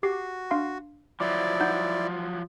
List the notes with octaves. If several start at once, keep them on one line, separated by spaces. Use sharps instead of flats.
F#4 G4 D6 C7
D4 F5 C6
F3 F#3 E4 D5 D6
D#4 F#5 G6